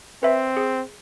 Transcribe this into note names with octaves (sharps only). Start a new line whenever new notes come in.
C4 B4 E5
G#4